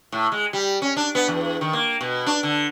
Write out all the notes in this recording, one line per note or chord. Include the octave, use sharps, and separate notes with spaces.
A2
G#3
G3
C#4
D4
B3
E2
D#3
A#3
B2
D4
D3